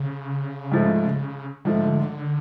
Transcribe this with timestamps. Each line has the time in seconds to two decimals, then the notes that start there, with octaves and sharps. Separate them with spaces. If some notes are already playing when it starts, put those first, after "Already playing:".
Already playing: C#3
0.72 G#2 F3 A3
1.65 G#2 D3 F3 A3